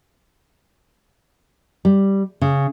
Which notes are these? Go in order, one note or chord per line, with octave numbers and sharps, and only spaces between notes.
G3
C#3